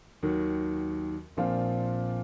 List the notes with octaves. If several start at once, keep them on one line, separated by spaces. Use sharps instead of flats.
D#2 D#3 F#3
A#1 A#2 F3 C4 F4